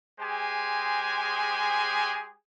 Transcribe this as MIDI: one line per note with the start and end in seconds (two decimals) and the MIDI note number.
0.19 2.35 56
0.19 2.35 67
0.19 2.35 68
0.19 2.35 72
0.19 2.35 80